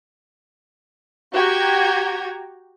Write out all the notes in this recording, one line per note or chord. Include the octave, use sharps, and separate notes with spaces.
F#4 G4 G5 A#5 G#6